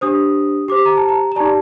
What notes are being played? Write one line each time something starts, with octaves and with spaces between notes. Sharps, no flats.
D4 G4 C5 D#6
G4 C5 D6
A#5
A5
A#5
A#5
D#4 G4 D5 A5